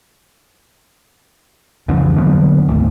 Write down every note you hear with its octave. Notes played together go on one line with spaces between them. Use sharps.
F2 C#3 E3 F3
D3 F#3 A#3 B3
G#1 D2